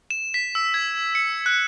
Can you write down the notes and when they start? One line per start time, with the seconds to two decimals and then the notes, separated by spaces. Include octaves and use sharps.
0.10 E7
0.34 B6
0.55 E6
0.74 G#6
1.15 C#7
1.46 F#6